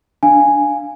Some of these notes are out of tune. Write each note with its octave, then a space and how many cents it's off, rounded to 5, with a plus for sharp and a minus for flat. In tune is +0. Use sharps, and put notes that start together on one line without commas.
D4 +0 F5 +0 G#5 +0